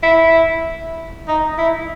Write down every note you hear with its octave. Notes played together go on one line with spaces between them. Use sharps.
E4
D#4
E4